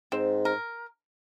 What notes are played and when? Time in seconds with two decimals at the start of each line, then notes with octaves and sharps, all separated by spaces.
0.12 G#2 C4
0.45 A#4